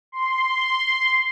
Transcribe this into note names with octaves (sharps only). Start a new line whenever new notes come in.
C6